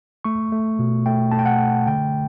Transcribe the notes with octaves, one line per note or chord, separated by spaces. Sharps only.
A3 C#6
A3
B2
A3 G5
A3 A5
G5
F#5
A3
D3 G5